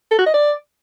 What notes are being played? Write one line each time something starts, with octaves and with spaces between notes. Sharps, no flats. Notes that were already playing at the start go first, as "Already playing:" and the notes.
A4
F#4
D#5
D5